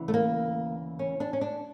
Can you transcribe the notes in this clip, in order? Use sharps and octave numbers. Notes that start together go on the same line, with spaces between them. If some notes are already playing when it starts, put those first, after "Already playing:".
Already playing: D2 C#3 E3
A3
A#3
C#4
D4
C#4
D4